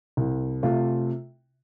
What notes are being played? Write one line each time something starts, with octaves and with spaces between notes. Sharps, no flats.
C2
C3 A3 F4